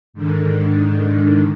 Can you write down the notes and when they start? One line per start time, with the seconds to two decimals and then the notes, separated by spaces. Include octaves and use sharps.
0.14 G#2 D3 D#3